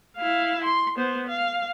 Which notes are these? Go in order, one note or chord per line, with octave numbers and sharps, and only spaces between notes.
E4 F5
C6
B3 C5
F5